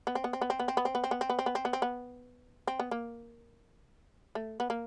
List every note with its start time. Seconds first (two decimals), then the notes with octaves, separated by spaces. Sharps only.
0.07 B3
0.15 C4
0.24 B3
0.33 C4
0.41 B3
0.50 C4
0.59 B3
0.68 C4
0.77 B3
0.85 C4
0.95 B3
1.04 C4
1.11 B3
1.21 C4
1.30 B3
1.39 C4
1.46 B3
1.55 C4
1.65 B3
1.73 C4
1.82 B3
2.67 C4
2.80 B3
2.91 A#3
4.35 A3
4.60 B3
4.70 A#3